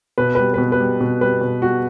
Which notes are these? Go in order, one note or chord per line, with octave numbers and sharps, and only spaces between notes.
B2 B4
G3 B4
B4
B2
B4
G3
B2
G3 B4
B2
G3 F#4